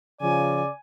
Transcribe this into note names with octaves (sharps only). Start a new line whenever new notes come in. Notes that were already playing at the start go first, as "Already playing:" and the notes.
C#3 F3 D5 G#5